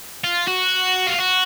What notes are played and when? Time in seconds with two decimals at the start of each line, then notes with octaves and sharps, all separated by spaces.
0.24 F4
0.47 F#4
1.07 F4
1.19 F#4